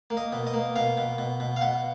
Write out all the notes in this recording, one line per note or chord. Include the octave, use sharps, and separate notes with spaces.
A#3
D#5
B2
D#5
A#3
B2 F5
B2
B2
B2
F5
B2 F#5